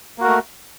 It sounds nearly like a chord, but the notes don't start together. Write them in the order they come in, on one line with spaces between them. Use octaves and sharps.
A#3 F#4 A#4 A3